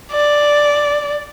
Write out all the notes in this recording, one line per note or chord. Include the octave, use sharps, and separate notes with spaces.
D5